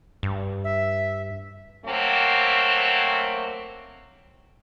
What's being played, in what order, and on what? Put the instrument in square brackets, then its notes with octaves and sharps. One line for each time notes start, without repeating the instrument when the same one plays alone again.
[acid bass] G2
[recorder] E5
[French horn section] F#3 A3 A#3 C4